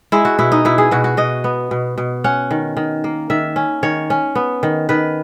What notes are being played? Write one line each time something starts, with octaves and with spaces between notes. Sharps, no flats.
G#3 E4
F#4
B2 E4
D#4
B2 E4
G#4
B2 F#4
F#4
B2 D#5
B3
B2
B2
C#4 F#5
D#3
D#3
A#3
D#3 E5
C#4
D#3 C#5
C#4
B3
D#3
D#3 B4